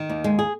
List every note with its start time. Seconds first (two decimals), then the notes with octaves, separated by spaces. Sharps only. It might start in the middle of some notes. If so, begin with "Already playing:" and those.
Already playing: D#3
0.09 D#2
0.24 G#3
0.39 G#4